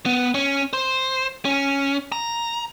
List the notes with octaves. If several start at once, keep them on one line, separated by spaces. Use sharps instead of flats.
B3
C#4
C5
C#4
A#5